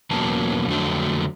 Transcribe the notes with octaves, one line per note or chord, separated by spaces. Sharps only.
E2 B2 F#3 A#3 C#4 A5
F2 D3 F#3 A3 D4